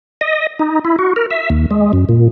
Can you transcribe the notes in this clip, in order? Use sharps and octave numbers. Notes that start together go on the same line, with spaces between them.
D#5
D#4
E4
F#4
A#4
E5
D#2
G#3
F#2
A#2